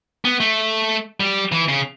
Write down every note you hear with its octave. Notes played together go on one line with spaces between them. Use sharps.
B3
A3
G3
E3
C#3